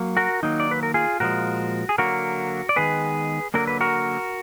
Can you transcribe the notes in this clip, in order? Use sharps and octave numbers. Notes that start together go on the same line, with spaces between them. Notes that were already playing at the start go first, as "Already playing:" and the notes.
Already playing: F#3 A#3
F#4 A#4
D#3 F#3 A#3 D#4
D5
B4
A#4
F4 G#4
A#2 F3 G#3 F#4 A#4
G#4
D3 F#3 A#3 F#4 A#4
D5
D#3 G#3 B3 G#4 B4
D3 F#3 A#3 A#4
B4
F#4 A#4